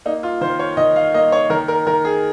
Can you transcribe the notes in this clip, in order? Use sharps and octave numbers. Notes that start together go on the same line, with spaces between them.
A#3 D#4
F4
D#3 C5
C#5
D#3 D#5
F5
A#3 D#5
C#5
D#3 A#4
A#4
D#3 A#4
G#4